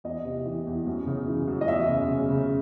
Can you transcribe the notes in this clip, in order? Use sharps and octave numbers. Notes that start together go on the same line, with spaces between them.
E2 D#5
C3
E3
E2
F#2
C#3
E3
F#2
D#5
E2 E5
C#3
C#3
C#3